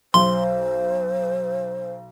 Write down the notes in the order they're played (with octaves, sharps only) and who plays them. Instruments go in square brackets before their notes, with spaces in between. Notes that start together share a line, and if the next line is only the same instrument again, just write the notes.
[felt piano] B1 [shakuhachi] C5 [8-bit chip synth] C6